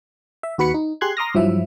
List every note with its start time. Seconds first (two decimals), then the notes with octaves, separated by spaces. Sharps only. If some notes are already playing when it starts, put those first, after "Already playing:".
0.43 E5
0.58 D#2 F#4 B4 B5 C#7
0.74 D#4
1.01 G4 G#4 C6 F#6 G#6
1.17 A#5 C6 D6 D#6 F6 A#6
1.34 G2 F3 F#3 E4 E5